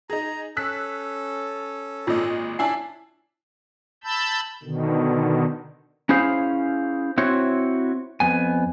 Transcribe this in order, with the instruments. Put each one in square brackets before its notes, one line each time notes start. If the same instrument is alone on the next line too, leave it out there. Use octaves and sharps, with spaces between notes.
[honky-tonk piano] D#4 G#4 [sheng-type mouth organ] A#5
[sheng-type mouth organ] C#4 A4 [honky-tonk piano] E6 F#6 B6
[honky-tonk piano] G#1 A#2 D#5 [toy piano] F4
[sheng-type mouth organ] C#4 [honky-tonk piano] D4 E4 C7 [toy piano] G#5 A5
[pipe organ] A5 B5 E6 G6
B2 D3 D#3
[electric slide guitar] C#4 E4 G#4 C5 F5
C4 E4 F#4 C#5
F2 B3 G#5